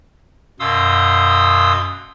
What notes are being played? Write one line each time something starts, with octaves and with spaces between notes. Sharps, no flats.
F#2 B2 F5 C6 D#6 E6